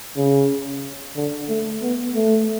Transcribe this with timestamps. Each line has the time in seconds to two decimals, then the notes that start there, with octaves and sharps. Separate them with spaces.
0.17 C#3
1.16 D3
1.49 A3
1.82 B3
2.15 A3